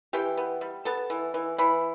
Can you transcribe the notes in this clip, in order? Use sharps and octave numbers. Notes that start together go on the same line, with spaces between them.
E3 G4 G5
B3
G3
B3 A4 A5
E3
E3
E3 B5